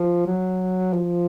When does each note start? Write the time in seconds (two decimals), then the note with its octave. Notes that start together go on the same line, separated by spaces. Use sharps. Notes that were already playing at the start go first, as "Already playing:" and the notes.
Already playing: F3
0.26 F#3
0.93 F3